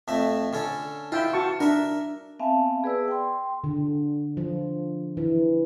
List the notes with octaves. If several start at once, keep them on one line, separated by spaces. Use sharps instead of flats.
F2 A3 E5
D3 C#4 A4
E4 F4 E5 G5
F#4 A5 C#6
D4 A#4 E5
B3 C4 E5 F5 G#5 A5
B3 G#4 B4 D5 E6
G5 C6
D3
F3
E3